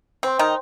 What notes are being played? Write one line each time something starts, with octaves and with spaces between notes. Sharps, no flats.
C4 C5 G5 C6
D#3 D#4